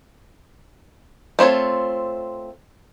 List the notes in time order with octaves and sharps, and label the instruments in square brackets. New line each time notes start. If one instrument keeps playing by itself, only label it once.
[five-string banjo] A3 C4 F4 C#5